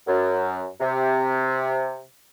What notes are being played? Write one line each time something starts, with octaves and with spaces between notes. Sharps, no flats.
F#2
C3